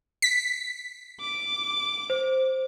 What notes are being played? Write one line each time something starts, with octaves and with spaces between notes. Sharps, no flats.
B6
D6
C5